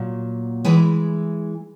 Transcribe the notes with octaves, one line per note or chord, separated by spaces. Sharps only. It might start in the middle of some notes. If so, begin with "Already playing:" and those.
Already playing: A#2 F#3
E3 G#3 G#4 B4